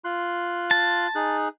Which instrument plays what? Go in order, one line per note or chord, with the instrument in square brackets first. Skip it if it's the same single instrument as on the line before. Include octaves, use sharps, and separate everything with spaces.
[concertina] F4 C6 F#6
[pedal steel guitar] A5
[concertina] D#4 G#4 F#6